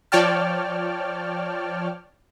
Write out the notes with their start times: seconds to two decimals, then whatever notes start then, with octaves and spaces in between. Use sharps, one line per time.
0.12 F3 C#5 D5 G5 A5 F6